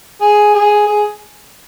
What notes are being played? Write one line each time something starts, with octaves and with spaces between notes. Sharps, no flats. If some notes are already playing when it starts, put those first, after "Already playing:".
G#4
G#4
G#4